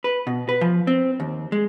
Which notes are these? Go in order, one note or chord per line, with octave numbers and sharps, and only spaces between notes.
B4
B2
B4
F3
C4
D#2
G#3